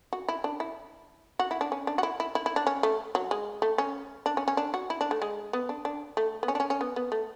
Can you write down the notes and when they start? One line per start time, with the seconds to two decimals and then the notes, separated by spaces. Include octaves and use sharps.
0.13 F#4
0.29 E4
0.44 D4
0.60 E4
1.39 F#4
1.51 E4
1.61 D4
1.72 C#4
1.87 D4
1.98 F#4
2.03 E4
2.20 E4
2.35 E4
2.46 E4
2.56 D4
2.67 C#4
2.83 A3
3.15 F#3
3.31 G#3
3.62 A3
3.78 C#4
4.26 D4
4.37 C#4
4.48 C#4
4.57 D4
4.74 F#4
4.90 E4
5.01 D4
5.11 A3
5.22 G#3
5.53 B3
5.69 D4
5.85 D4
6.17 A3
6.43 B3
6.48 C#4
6.55 D4
6.60 C#4
6.70 C#4
6.81 B3
6.96 B3
7.12 A3